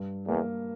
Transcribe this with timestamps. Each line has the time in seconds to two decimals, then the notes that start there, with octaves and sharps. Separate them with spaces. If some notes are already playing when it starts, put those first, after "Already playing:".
Already playing: G2
0.28 E2 A#3